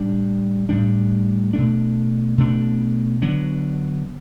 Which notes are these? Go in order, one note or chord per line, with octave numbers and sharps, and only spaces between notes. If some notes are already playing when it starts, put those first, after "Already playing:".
Already playing: A2 G3 D4
A2 G3 D4
B2 A3 D4
B2 A3 D4
D3 F#3 B3 D4